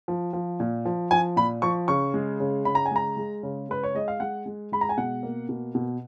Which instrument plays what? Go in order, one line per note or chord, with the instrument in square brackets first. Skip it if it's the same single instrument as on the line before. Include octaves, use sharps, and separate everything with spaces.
[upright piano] F3
F3
A#2
F3
F3 G#5
A#2 B5
F3 C#6
C#3 C#6
G#3
C#3
C#3 B5
A#5
G#5
G#3 A#5
G#3
C#3
G#3 B4
C#5
G#3 D#5
F5
G#3 F#5
G#3
G#3 B5
A#5
G#5
B2 F#5
A#3
B2
B2